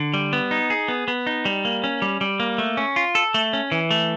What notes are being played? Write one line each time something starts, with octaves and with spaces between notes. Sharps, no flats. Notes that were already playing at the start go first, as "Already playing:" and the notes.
Already playing: D3
G3
B3
D#4
G#4
B3
B3
D#4
G3
A#3
C#4
G3
G3
A#3
A3
C#4
F4
A4
A3
C#4
E3
A3